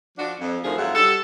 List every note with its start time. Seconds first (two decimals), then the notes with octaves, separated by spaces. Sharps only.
0.18 F3 D4 F#4
0.40 F2
0.64 D2 D3 D#3 F3 A3 G#4
0.77 F2 G#2 F#3 F4 E5 F#5
0.95 G3 D4 F#4 A4